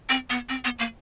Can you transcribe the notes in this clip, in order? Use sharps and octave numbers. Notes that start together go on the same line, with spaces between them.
C4
B3
C4
B3
A#3